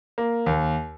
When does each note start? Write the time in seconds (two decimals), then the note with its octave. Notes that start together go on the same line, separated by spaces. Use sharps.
0.18 A#3
0.46 D#2